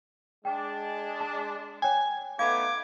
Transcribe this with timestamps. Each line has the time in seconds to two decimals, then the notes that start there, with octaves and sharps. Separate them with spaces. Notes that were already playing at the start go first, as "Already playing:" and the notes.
0.45 G#3 D4 G5
1.20 A5
1.82 C#5 G5 G#5
2.39 A3 B3 D#4 F5 D6 G#6